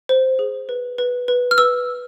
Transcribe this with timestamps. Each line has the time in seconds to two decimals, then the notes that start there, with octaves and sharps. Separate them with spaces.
0.09 C5
0.39 G#4
0.69 B4
0.98 B4
1.28 B4
1.51 F6
1.58 B4 E6